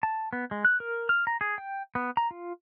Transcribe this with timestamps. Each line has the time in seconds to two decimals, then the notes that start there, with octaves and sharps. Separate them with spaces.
0.03 A5
0.33 B3
0.51 G#3
0.65 F#6
0.80 A#4
1.09 F6
1.27 A#5
1.41 G#4
1.58 G5
1.95 B3
2.17 A#5
2.31 F4